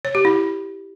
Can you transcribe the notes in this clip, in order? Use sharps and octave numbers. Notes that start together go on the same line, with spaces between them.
C#5
G4
E4